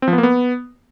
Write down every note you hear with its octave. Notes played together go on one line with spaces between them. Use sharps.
C4
F3
B3
A#3
B3